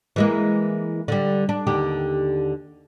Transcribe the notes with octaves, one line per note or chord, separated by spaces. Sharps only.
E3 G#3 A#3
D3 G3
D4
D#2 D3 G4